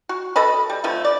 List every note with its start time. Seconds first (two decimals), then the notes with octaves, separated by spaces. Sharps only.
0.09 F#4
0.36 A4 B4 D#5 B5
0.70 G3
0.84 D3 F3 A3 B3
1.05 D5